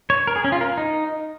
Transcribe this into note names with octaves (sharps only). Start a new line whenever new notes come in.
C#5
A#4
G#4
C#4
F4
A#4
D#4